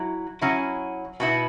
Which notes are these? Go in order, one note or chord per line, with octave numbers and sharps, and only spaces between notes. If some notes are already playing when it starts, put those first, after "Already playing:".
Already playing: F#3 E4
F#3 C#4 E4
B2 B3 E4